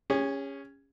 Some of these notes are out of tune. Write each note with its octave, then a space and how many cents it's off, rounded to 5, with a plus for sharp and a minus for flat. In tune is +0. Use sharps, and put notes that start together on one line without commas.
C#4 +0 G#4 -40